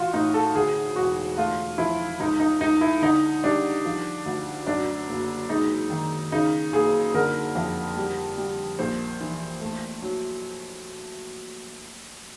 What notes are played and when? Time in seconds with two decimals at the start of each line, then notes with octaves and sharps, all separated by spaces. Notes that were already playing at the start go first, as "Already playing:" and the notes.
Already playing: A1 F4 F#4
0.13 A2 D#4
0.34 A4
0.55 D2 G#4
0.96 E1 F#4
1.38 A3 F4
1.78 F3 E4
2.19 C#2 D#4
2.40 D#4
2.61 C#2 D#4
2.81 E4
3.02 D3 D#4
3.44 G3 D4
3.85 F3
4.26 D2
4.67 F#2 D4
5.09 F#1
5.49 G#3 D#4
5.90 D#3
6.32 C#3 D#4
6.73 F#1 G#4
7.14 D3 A#4
7.55 F2
7.97 G3
8.38 G3
8.79 A#1 C5
9.21 E3
9.61 A3
10.02 F#3